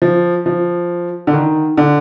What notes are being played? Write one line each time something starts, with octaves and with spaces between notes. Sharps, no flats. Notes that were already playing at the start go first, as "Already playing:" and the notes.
F3
F3
D3
D#3
D3